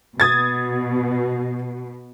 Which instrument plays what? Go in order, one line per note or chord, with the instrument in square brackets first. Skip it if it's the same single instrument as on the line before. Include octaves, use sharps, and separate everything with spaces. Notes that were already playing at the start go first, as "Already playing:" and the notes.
[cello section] B2 [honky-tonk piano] D#6 G#6 A6